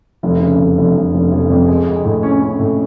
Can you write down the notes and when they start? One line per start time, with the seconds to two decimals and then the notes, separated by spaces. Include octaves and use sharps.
0.23 F1
0.40 C#3
0.59 F1
0.78 F1
0.96 F1
1.14 F1
1.32 F1
1.50 F2
1.68 G#3
1.87 G#3
2.05 A2
2.23 C#4
2.41 C#4
2.59 A2